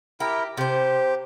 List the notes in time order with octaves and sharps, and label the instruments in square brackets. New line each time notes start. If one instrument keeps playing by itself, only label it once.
[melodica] E4 A#4 [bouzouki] G4
[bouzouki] C3 C5 [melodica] G4